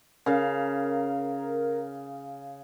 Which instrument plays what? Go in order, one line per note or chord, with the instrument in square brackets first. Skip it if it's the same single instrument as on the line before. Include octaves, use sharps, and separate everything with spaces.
[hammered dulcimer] C#3 F5 [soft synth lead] A#4